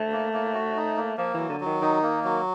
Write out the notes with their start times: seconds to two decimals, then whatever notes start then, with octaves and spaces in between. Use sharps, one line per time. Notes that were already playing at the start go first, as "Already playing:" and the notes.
Already playing: A3
0.12 A#3
0.33 A#3
0.54 F#4
0.76 D#4
0.96 A#3
1.17 F3 A#3
1.34 E3 F#3
1.49 D3
1.60 F#3
1.66 D#3
1.81 D#3 D#4
2.03 A#3
2.24 F#3